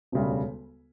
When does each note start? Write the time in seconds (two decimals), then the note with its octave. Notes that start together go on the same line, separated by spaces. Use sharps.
0.12 E1 D2 C#3 G3